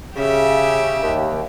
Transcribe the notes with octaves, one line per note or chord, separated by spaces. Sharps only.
C#3 G4 E5
D#2